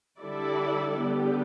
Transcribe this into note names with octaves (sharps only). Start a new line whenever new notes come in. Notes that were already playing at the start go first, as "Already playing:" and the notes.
D3 G3 E4 A4 D5
D3 G3 B3 G4